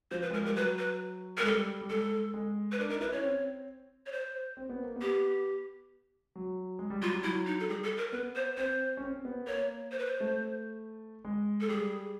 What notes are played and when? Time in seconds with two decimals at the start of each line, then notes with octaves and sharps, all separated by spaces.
0.11 F3 C5
0.22 B4
0.30 G#3 A#4
0.44 G3 A#4
0.56 F#3 B4
0.78 B4
1.38 G#3 A#4
1.45 G3 A4
1.82 G3
1.90 G#3 A4
2.34 G#3
2.72 B4
2.79 D4 A#4
2.89 D#4 A#4
3.01 E4 B4
3.12 C#4 C#5
3.23 C4
4.06 C#5
4.12 C5
4.57 C4
4.69 B3
4.83 A#3
4.96 B3
5.01 G4
6.35 F#3
6.79 G#3
6.90 G3
7.02 F#3 F4
7.12 G3
7.23 F#3 E4
7.46 D#4
7.60 A4
7.69 G3 G#4
7.84 A4
7.98 A#4
8.12 B3 B4
8.35 C5
8.57 C4 C5
8.97 C#4
9.02 C4
9.25 B3
9.47 A#3 C#5
9.92 C5
9.99 B4
10.06 C5
10.20 A3
11.25 G#3
11.61 A4
11.69 G3 G#4